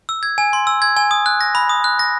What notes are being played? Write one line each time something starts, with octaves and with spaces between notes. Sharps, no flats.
E6
G#6
G#5
C6
E6
G#6
G#5
D#6
F#6
A#6
B5
D#6
F#6
A#6